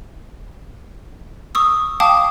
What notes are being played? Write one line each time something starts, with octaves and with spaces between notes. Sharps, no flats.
C#6 D#6 E6
F5 G5 A5 D6 D#6